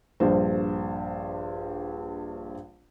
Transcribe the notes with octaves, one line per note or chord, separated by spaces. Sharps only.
A#1 G2 C5